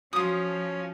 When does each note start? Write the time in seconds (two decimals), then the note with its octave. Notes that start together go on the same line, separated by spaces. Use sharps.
0.13 F3 C#4 F4 F#4 D#6